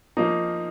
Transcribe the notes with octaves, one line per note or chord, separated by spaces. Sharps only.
F3 A#3 D#4